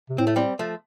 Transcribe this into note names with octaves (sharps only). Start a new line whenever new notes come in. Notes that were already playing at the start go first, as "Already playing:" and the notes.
C3
A2 C4
A3
G3 C4
F3 A3